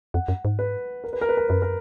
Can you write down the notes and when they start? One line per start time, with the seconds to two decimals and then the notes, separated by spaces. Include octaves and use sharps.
0.14 F2 F#5
0.28 F#2
0.45 G#2
0.59 B4
1.04 A#4
1.13 B4
1.21 A#4
1.29 B4
1.37 A#4
1.49 F#2 B4
1.62 A#4